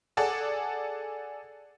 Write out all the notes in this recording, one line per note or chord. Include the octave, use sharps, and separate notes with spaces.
G#4 A4 D5 F#5 A5